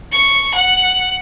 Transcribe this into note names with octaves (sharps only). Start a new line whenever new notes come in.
C#6
F#5